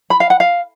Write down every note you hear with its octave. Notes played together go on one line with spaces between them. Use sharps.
B5
F5
F#5
F5